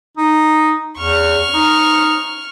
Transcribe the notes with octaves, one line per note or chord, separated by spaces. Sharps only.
D#4
E2 C#6 F6
D#4